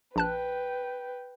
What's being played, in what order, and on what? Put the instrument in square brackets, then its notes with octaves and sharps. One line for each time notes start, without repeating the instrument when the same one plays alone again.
[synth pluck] A#1 A5 F#6 [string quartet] B4 G5